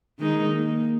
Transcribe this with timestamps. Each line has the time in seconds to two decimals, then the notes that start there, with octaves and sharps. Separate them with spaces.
0.19 D#3 G#3 D#4
0.52 A#3